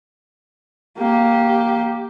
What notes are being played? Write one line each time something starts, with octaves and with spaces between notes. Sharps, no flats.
A#3 G4